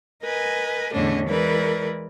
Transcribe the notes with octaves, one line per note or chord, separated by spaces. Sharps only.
A#4 B4 D#5 G#5
E2 A2 D3 C#4 D4 D#5
E3 G#3 A#4 B4 D5